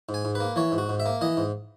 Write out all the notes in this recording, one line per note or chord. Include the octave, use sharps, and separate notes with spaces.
G#2
G#5
G#2
A#3 B4
E3 C#5
G#2
F#4
G#2
E5
A#3
E3 D#5
G#2